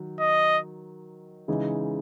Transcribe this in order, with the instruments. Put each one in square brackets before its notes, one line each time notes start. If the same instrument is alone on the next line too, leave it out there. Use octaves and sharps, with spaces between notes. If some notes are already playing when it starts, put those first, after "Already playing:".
Already playing: [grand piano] D#3 F#3
[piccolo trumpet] D#5
[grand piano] C#3 E3 G#3 D#4 G#4